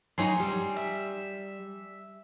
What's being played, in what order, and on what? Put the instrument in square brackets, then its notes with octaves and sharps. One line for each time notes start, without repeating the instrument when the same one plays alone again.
[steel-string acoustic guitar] F#3 D#4 A#5 [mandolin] G#4 G#5 C6
[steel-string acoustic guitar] G3
[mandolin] E5